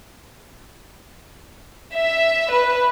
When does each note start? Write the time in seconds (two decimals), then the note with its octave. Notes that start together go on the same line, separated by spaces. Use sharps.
1.93 E5
2.50 B4